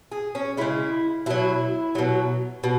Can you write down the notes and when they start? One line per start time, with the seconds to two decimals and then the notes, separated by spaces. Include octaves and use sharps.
0.12 G#4
0.35 C#4
0.58 C#3 G#3 E4
1.26 B2 F#3 E4
1.95 B2 F#3
2.64 B2